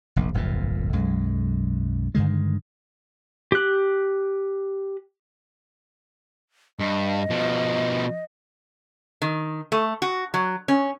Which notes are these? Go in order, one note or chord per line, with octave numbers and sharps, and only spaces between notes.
F1 A#1
D1 G1 F2 A#2
B1 F#2 G#3
G2 D3 D#3 G#3
G4 F#6
G2 D#5
B2 F3
D#3
A3
F#4
F#3
C#4